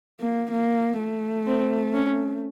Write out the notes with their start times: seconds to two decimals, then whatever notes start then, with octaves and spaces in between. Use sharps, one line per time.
0.20 A#3
0.52 A#3
0.99 A3
1.47 C4
1.94 C#4